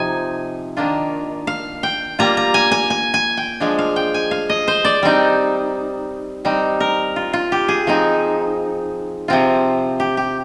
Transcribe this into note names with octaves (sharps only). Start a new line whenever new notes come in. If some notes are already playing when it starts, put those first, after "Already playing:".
Already playing: C3 F3 C4 D#4 G#5
D#3 A#3 D4 F4
F5
G5
G3 A#3 F4 A#5
A#5
G#5
G#5
G#5
G#5
G5
F3 G#3 D4
F5
G5
G#5
F5
D#5
C5
D5
G3 C4 D#4
G3 C4 D#4
A#4
F4
F4
G4
G#4
F3 C4 D#4
C3 F3 C4 F4
G4
G4